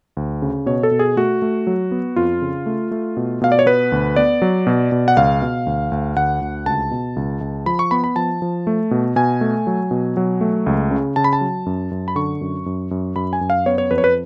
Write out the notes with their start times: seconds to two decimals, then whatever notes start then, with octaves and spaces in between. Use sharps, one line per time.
0.17 D2
0.42 C#3
0.66 B2 C#5
0.83 A4
0.91 B2
0.99 G#4
1.16 A3 F#4
1.42 A3
1.67 F#3
1.91 B3
2.16 F2 F4
2.42 C#3
2.66 A3
2.91 A3
3.17 B2
3.41 B2 F5
3.52 D5
3.59 C#5
3.66 B3 B4
3.92 D2
4.16 B3 D5
4.42 F#3
4.67 B2
4.92 B2
5.08 F#5
5.17 C#2 F5
5.42 B2
5.66 D2
5.92 D2
6.16 D2 F#5
6.41 D2
6.66 C#2 A5
6.91 B2
7.16 C#2
7.41 C#2
7.66 F3 B5
7.79 C#6
7.91 B3 B5
8.04 B5
8.16 F3 A5
8.42 F3
8.67 A3
8.91 B2
9.16 B2 G#5
9.41 A3
9.67 F#3
9.91 B2
10.17 F#3
10.41 A3
10.66 C#2
10.91 C#3
11.16 C#3 A5
11.24 B5
11.33 A5
11.41 F#3
11.66 F#2
11.91 F#2
12.08 B5
12.16 D3 C#6
12.41 F#2
12.66 F#2
12.91 F#2
13.16 F#2 B5
13.33 G#5
13.41 F#2
13.50 F5
13.66 B3 C#5
13.78 C#5
13.91 F2 B4
13.98 C#5
14.04 B4